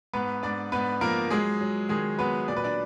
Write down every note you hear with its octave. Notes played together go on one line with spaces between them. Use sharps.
G#2 B3 B4
G#2 D4 D5
G#2 B3 B4
F3 A#3 A#4
F#3 G#3 G#4
F#3
D#3 G#3 G#4
F#3 B3 B4
A#2 D5
B4
D4 D5